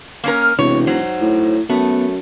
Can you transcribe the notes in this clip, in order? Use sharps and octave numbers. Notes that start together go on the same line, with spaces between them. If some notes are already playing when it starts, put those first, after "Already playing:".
A#3 C#4 A#4
E1 C3 E3 C#5
F#3 D#4 C5
A2
F#2 A3 B3